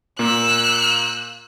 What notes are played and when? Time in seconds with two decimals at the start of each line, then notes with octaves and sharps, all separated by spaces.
0.19 A#2 A#3 E6 F#6